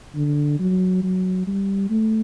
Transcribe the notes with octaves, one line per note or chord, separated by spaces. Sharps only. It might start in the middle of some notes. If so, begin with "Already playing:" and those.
D3
F#3
F#3
G3
A3